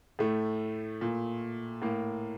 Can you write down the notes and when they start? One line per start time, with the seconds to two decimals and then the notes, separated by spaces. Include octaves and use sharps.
0.19 A2 A3
1.01 A#2
1.82 A2 A#3